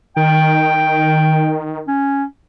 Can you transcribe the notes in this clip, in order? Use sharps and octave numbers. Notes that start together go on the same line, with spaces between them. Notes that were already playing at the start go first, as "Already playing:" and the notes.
D#3 G5
C#4